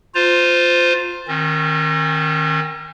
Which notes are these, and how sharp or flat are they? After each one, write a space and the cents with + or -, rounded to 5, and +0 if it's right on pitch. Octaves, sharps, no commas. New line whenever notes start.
F4 +10 C5 -20 A#5 -20
D#3 +0 C#4 -45